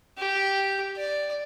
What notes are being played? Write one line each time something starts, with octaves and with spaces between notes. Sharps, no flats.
G4
D5